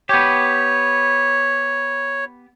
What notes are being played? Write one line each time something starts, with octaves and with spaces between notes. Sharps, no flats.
B3 G4 C#5